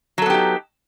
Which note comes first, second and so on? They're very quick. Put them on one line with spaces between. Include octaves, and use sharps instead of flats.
F#3 A4 B3 G4 D#4